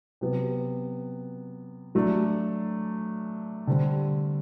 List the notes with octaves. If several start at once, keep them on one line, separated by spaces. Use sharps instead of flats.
C3 F#3 B3
F#3 A3 D4
D3 G3 C4